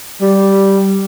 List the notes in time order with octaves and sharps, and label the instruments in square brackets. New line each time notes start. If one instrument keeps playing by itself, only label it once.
[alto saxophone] G3